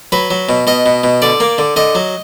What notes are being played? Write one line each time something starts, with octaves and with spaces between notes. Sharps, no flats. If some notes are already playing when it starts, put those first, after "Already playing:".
F#3 B4
F#3
B2
B2 D#5
B2
B2
D3 D5
A#3
D3
D3 D#5
F#3